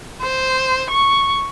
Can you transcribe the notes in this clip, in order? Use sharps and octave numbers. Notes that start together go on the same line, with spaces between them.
C5
C#6